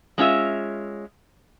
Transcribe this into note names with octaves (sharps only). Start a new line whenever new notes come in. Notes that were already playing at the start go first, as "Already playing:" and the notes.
G#3 C#4 F4 E5